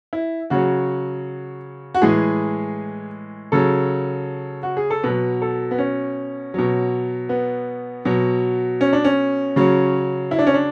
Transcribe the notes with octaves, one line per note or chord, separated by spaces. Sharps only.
E4
C#3 F#3 F#4
F#4
A2 E3 G#3 G#4
C#3 F#3 A4
F#4
G#4
A4
B2 F#3 B4
A4
B3
C#4
B2 F#3
B3
B2 F#3
C#4
D4
C#4
C#3 F#3
E4
D4
C#4
D4